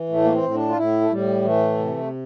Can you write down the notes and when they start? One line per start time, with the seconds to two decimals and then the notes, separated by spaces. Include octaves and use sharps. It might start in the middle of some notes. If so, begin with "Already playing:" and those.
Already playing: E3
0.09 A2 A3
0.24 A#3
0.32 C4
0.43 A2
0.54 D4
0.69 F4
0.77 A2 E4
1.01 A3
1.10 A2 G3
1.44 E3 A3
1.78 C3